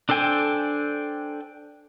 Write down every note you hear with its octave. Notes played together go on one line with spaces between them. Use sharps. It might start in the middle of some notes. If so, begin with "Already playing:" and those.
D4 A4 C5 G5 G#5